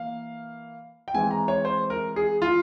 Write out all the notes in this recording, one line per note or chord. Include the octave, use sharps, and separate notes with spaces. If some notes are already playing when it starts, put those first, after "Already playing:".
Already playing: E3 A#3 F5
G5
E3 G#3 C4 G#5
A#5
C#5
C5
A#4
G#4
F4